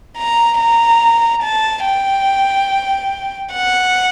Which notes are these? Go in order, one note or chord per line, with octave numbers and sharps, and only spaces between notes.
A#5
A#5
A5
G5
F#5